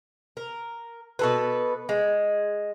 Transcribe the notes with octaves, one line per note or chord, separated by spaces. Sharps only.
A#4
B2 A4 B4
G#3